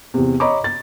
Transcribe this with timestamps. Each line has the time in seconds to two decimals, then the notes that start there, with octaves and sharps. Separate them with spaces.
0.14 E2 C3
0.40 C#5 D#5 A#5 B5 C#6 D6
0.64 A6